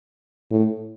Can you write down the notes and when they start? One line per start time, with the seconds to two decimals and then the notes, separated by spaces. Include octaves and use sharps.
0.51 A2